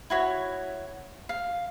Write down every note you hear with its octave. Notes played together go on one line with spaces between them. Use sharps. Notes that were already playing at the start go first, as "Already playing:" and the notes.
E4 F#4 C#5
F5